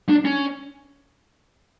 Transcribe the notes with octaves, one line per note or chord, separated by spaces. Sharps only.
D4
C#4